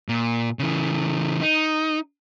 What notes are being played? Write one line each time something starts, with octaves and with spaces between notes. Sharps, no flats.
A#2
C#3 E3
D#4